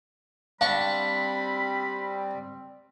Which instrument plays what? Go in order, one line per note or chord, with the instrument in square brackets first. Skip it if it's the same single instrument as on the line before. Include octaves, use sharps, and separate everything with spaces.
[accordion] G3 C4 [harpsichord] D4 C#6 [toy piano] F5 [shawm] B5